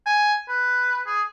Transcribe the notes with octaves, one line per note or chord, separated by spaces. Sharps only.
G#5
B4
G#4